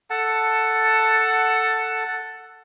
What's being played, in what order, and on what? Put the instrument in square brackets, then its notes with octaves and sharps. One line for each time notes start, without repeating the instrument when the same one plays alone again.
[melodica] A4 F#5 A5